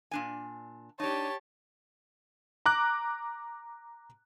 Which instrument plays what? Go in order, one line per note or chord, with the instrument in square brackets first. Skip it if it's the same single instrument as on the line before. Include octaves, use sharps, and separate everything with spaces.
[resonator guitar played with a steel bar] A#2 D4 G#5
[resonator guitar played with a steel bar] D4 D#4 [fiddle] G4 A5 [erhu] C#5
[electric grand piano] A#5 D6 F#6